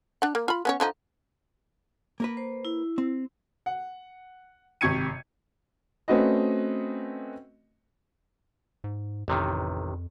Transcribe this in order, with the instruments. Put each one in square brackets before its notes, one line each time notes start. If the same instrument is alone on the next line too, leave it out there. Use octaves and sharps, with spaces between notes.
[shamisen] D4 F#5
A#3
F4 B5
B3 C#4 C#5
D3 F3 D#4
[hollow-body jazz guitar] A#3 A#4 B4
[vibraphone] C5
E4
[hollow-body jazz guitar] C4
[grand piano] F#5
G#1 C3 C#6 G#6 C#7 D#7
[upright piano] A3 C4 C#4 F#4 B4 D#5
[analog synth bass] G#2
[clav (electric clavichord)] A1 C3 D#3 [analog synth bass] F2